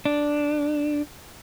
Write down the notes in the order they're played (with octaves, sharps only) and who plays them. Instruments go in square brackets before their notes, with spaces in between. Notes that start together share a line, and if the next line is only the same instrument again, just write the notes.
[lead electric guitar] D4